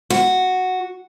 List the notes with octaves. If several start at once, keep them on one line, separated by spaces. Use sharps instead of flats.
F#4